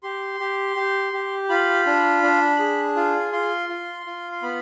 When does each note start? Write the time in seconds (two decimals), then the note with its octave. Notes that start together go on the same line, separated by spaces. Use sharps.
0.03 G4 C6
0.40 G4
0.76 G4
1.13 G4
1.49 F4 B5
1.86 D4
2.23 D4
2.59 G#4
2.96 F4
3.32 F4 C6
3.69 F4
4.06 F4
4.32 C6
4.42 B3 B5